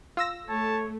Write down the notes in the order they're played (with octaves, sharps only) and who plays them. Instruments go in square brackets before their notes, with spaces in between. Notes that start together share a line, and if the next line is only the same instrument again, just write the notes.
[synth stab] F4 E6 A#6
[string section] A3 [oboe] C#5 [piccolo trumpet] A5